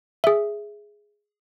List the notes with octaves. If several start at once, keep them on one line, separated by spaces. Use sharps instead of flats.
G#4 E5